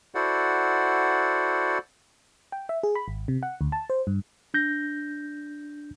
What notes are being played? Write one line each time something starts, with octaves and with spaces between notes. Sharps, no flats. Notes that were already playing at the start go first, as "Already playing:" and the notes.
E4 F#4 A4 C5 D5 F#5
G5
E5
G#4
B5
G#1
C3
F#5
D2
A5
C5
G2
D4 G6 A#6